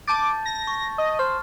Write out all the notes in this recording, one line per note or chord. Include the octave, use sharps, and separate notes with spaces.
A5 D6 G6 A6
A#6
C#6
D#5
C5 F6